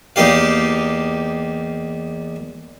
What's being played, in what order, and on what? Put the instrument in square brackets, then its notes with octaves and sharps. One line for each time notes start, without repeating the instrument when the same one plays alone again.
[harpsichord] E2 A#3 D#4 G4 F5